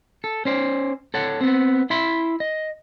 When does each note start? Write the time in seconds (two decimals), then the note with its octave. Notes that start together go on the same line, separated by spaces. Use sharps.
0.24 A4
0.45 C#4 C5 D5
1.14 A4 C#5 F#5
1.41 B3 C4
1.90 E4 E5 B5 C6
2.40 D#5